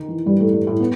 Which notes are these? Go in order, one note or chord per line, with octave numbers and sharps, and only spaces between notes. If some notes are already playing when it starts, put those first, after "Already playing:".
Already playing: D#3
E3
G2 G3
A2 A3
G2 G3
A2 A3
B3